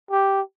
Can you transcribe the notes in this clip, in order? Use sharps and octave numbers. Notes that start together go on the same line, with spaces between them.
G4